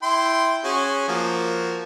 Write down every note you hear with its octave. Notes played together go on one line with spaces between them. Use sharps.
E4 G5 C6
C#4 F#4 G#4
F3 A#3 F#4